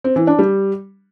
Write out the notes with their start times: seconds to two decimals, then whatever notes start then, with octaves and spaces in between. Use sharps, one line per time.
0.04 C4
0.16 E3
0.27 D4
0.39 G3